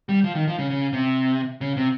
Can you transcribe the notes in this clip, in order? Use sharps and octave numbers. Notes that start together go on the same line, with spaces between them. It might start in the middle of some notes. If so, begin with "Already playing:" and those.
G3
F3
D#3
F3
C#3
C#3
C3
C#3
C3